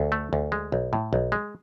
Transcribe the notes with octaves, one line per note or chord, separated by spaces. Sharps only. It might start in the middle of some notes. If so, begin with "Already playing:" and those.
Already playing: D2
A3
D2
G#3
B1
A2
B1
G#3